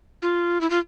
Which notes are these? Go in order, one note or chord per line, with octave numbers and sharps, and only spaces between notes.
F4
E4
F4